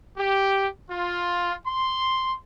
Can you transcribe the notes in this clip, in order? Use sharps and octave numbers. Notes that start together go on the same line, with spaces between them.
G4
F4
C6